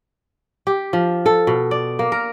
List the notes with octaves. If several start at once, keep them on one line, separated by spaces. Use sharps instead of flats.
G4
F3
A4
B2
D5
A#3
A#4